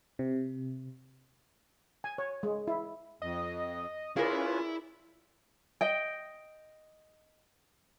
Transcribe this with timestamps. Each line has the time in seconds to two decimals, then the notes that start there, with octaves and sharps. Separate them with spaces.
0.19 C3
2.04 G#5
2.18 C#5
2.43 G#3
2.67 E4
3.22 F2 D#5
4.17 C#4 E4 F4 G#4 A#4 B4 C#5 D5
5.81 D#5 G5